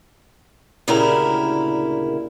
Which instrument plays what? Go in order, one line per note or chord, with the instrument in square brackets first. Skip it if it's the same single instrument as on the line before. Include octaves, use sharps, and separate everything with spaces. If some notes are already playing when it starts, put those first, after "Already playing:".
[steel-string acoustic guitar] D2 A#2 C#3 E4 G4 A#4